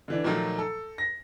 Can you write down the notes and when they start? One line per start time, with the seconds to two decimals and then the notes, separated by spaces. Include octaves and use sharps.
0.08 D3 E3 D4
0.24 A#2 D#3 F3 F#3 A3
0.58 A4
0.98 A#6